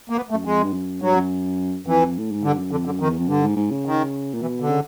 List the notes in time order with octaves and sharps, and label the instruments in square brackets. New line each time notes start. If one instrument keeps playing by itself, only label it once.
[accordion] A#3
B3
A3
[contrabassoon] F#2
[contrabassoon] F2 [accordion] G#3
[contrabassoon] G2
F#2
[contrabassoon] G2 [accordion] F#3
[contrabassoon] F#2
[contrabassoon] F2 [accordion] E3
[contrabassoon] A2
G#2
[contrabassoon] G2 [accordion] D3
[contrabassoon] F#2
[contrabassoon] F2 [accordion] D3
[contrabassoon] F#2 [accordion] D3
[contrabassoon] F2 [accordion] D#3
[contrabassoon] E2
F2
[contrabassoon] G2 [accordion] D3
[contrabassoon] G#2
G#2
C#3
[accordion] D#3
[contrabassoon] A#2
[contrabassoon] B2 [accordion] E3
[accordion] D3
[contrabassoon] C#3